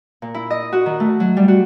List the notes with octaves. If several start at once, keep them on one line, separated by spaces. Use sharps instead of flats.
A#2
E4
D#5
F#4
D#3
A3
F#3
G3
F#4